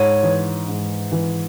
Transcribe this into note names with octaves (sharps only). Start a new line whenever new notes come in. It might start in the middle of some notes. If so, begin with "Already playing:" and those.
Already playing: G#2 C#5
E3
G#2
E3